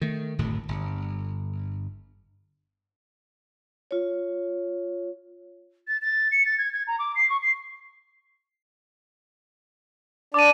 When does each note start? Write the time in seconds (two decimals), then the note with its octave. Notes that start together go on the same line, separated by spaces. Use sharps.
0.02 D#3 A3
0.39 D1 G#1 F#2 A2
0.68 G1
3.91 F4 C#5
5.87 A6
6.01 A6
6.31 C#7
6.45 A6
6.58 G#6
6.72 G#6
6.87 A#5
6.99 D6
7.15 C7
7.29 C#6
7.42 C7
10.34 D4 D5 D6 D#7